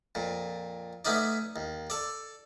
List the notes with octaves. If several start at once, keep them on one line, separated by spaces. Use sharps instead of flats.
F2 A#2
A3 B3 C#4 D#4 D5
D#2
A4 D5